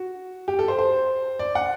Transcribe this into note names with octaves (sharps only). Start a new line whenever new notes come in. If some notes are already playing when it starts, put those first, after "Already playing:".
Already playing: F#4
G4
A4
C5
C5
D5
F#5